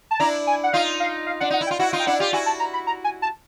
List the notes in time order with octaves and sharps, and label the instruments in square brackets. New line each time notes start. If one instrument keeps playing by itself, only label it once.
[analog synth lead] A5
[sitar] D4 E4 [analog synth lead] A#5
[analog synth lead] G#5
F#5
[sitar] D#4 F4 [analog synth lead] F5
[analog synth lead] F5
F5
[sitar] D4 [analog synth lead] F#5
[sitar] D#4 [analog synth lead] F#5
[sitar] E4
[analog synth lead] G5
[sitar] F4
[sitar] E4 F#4 [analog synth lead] F#5
[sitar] D#4 F4
[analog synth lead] G5
[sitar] D4 E4 [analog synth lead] F#5
[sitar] F4 G4
[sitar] E4 F#4 [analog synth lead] G#5
[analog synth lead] A5
A#5
B5
A#5
G#5
A5